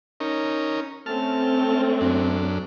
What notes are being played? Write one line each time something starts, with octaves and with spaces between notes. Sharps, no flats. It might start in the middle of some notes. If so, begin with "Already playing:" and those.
C#4 D#4 A#4
A3 C4 C#4 A5 F6
F#2 D4